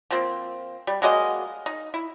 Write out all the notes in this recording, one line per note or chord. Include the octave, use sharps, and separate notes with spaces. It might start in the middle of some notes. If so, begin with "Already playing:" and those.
F3 A#3 C4
G3
F#3 G#3 A#3 D#5
D#4
E4